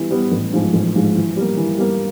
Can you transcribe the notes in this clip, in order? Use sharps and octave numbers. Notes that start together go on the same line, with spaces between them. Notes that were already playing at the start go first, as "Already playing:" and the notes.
Already playing: E3 G3 B3
G3 B3
A1
G#2 F3 G#3
A1
G#2 F3 G#3
E3
G3 A#3
E3
G3 A#3